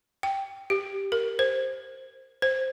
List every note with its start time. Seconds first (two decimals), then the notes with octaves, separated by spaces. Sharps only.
0.23 G5
0.70 G4
1.12 A#4
1.39 C5
2.42 C5